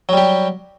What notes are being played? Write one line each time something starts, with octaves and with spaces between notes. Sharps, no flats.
F#3 G3 G4